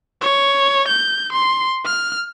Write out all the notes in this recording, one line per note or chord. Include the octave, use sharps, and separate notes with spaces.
C#5
G6
C6
F6